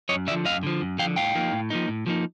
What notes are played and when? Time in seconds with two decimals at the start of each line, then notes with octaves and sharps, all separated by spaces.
0.09 F#2 C#5 D#5
0.27 D3 D5 E5
0.31 F3
0.45 F#2 D#5 F5
0.63 D3 F3
0.81 F#2
0.99 D3 F3 F5 G5
1.16 A2 F5 G5
1.35 F3 A#3 D#4
1.52 A2
1.70 F3 A#3 D#4
1.88 A2
2.06 F3 A#3 D#4